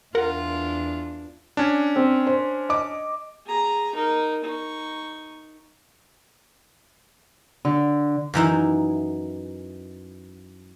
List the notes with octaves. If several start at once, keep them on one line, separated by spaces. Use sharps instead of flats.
E2 D4 F4 A#4 F#5
C#4 D4
C4
C5
D#5 D6
G#4 A#5
D#4 A#4
D#4 C#6
D3
F#2 E3 D#4 E4